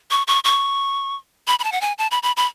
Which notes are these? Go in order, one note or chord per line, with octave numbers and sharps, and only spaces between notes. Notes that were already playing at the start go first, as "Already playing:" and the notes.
C#6
C#6
C#6
B5
B5
A5
F#5
G#5
A5
B5
B5
B5